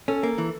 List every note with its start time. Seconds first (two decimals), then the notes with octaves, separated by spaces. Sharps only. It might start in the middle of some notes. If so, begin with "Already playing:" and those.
0.08 C#4 A4
0.23 A#3
0.38 E3